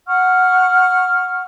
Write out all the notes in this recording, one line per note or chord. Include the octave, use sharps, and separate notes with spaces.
F#5 C#6 F6